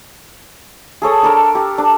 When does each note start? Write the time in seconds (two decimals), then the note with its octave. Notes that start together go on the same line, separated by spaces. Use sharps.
1.02 G#4 A4 C#5 D#6
1.23 D4 A4 A#4
1.55 G4
1.78 D4